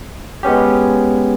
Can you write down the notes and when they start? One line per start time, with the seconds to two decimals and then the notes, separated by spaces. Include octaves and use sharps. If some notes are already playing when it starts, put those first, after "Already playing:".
0.43 G#3 B3 C#4 G4